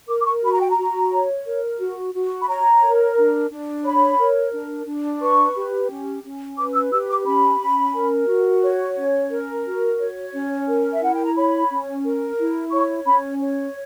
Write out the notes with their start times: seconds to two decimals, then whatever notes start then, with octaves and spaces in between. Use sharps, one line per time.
0.08 A#4 D6
0.20 D6
0.26 C#6
0.43 F#4 B5
0.51 A#5
0.60 G5
0.70 A#5
0.77 F#4
1.11 C#5
1.45 A#4
1.79 F#4
2.14 F#4
2.42 B5
2.47 C#5 A#5
2.82 A#4
3.17 D4
3.50 D4
3.85 C#5 B5
4.18 A#4
4.52 D4
4.86 D4
5.21 B4 C#6
5.55 G4
5.89 C#4
6.23 C#4
6.57 B4 D6
6.74 E6
6.92 G4 E6
7.09 D6
7.26 C#4 B5
7.61 C#4
7.94 A#4
8.28 F#4
8.63 C#5
8.97 C#4
9.30 A#4
9.65 F#4
9.99 C#5
10.33 C#4
10.67 A#4
10.93 E5
11.01 E4 F#5
11.14 G5
11.24 A#5
11.36 C#5 B5
11.70 C#4
12.04 A#4
12.38 E4
12.72 C#5 C#6
13.06 C#4 B5
13.40 C#5